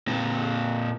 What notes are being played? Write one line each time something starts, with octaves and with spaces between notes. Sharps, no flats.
A#2 C4